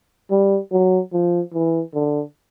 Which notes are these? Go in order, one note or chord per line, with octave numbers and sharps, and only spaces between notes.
G3
F#3
F3
E3
D3